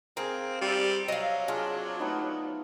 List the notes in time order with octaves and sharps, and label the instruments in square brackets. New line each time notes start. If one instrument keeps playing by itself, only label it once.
[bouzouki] A#3 [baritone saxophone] C4 [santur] G#4 A#4
[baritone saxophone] G3 [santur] C4 E5
[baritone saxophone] F#3 [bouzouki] D#5 F5
[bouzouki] D4 [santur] F4 G#4
[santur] A3 B3 D#4